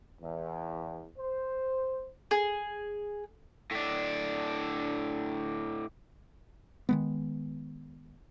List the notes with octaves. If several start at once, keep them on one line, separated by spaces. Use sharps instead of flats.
E2
C5
G#4
A2 D4
D#3 G#3 B3